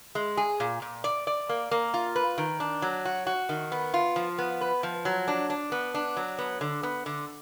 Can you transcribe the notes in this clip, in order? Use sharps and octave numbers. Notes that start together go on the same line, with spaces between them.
G#3
G#4
A#2
A#2
D5
D5
A#3
A#3
F4
B4
D#3
D4
F#3
F#4
F#4
D#3
B3
F4
F3
B3
B4
F3
F#3
D4
D4
B3
D4
F#3
B3
D3
B3
D3